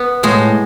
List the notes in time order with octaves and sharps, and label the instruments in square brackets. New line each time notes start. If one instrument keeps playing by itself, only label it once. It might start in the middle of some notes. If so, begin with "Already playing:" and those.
Already playing: [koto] B3
[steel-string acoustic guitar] A2 [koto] G#3